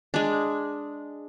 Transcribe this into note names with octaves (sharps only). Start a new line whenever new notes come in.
G#3 D4